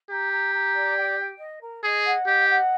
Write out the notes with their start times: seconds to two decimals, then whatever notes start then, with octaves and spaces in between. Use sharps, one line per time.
0.10 G4 A#5
0.31 A#5
0.54 A#5
0.75 D5
0.96 G5
1.18 G5
1.39 D#5
1.62 A#4
1.83 G#4 D#5
2.05 F#5
2.26 G4 D#5
2.48 F#5